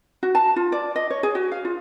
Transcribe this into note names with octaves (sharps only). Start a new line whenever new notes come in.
F#4
A5
F4
D5
D#5
C#5
G#4
F#4
F5
F4